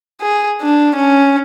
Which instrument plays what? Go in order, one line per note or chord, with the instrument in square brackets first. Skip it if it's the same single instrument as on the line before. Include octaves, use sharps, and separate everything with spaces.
[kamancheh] G#4
D4
C#4